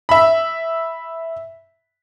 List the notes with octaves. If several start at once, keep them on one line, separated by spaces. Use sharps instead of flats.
E5 B5